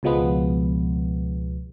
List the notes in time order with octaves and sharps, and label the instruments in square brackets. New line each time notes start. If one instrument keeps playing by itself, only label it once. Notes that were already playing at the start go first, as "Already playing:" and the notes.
[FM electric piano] C#2 B2 F3 G#3 B3